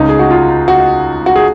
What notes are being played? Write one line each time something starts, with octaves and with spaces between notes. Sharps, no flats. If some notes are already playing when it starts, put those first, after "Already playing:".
Already playing: C#2 C#3 D#4
G#4
F#4
F4
F#4
F#4
G#4